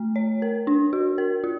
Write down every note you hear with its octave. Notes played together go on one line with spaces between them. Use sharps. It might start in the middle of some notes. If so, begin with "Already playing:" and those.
Already playing: A3
C#5
A#4
D4
F#4
A#4
F4